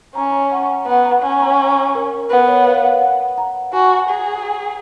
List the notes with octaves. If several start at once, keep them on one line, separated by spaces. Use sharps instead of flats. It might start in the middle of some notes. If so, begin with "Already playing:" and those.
C#4 A#5
A#5
F#5
B3 F#5
A#5
C#4 G#5
A#5
A#4
B3 B4
C#5
F5
F#5
F#5
A#5
F#4 G#5
G#4